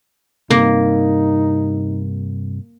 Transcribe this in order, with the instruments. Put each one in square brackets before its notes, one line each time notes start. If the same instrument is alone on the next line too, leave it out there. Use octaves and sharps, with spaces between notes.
[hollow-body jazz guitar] G2 C3 [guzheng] A#3 [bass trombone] D#4